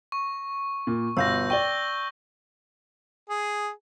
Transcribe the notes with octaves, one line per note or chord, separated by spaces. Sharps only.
C#6
A#2
G1 B2 F5 E6 G6 A#6
D5 G5 C#6 G7
G#4